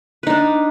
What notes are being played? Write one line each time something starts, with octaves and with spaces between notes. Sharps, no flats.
D4 D#4 B4